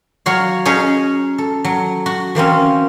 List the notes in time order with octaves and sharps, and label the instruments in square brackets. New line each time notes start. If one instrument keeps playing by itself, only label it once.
[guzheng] F#3 F#4 C#5 F5
C#4 D#4 G#4 C#5
A4
F#3
F#4
E3 A#3 C4 C#4